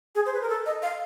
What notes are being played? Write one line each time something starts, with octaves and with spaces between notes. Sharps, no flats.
G#4
C5
B4
A#4
A4
D#5
F5